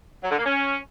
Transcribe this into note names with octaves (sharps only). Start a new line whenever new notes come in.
F#3
D3
A#3
C#4